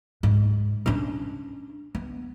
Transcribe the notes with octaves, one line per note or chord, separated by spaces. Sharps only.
G#2
C#4 D4
B3